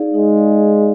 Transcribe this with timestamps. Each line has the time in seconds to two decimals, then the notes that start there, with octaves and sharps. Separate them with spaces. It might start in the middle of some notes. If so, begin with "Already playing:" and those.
Already playing: D#4 G#4 D5 F5
0.14 G#3 D#4
0.37 G#4 D5 F5
0.60 D#4